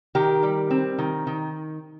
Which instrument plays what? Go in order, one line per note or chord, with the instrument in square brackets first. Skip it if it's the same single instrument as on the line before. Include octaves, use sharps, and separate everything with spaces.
[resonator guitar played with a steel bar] D#3 G4 A#4
G3
C4
D#3
D#3